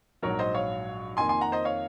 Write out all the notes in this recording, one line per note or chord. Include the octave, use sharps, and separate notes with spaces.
A#1 G#2 F#3 A#4 C#5
C5 D#5
C#5 F5
F2 D#3 A#3 G#5 C6
G#5 C6
F#5 A#5
C5 D#5
C#5 F5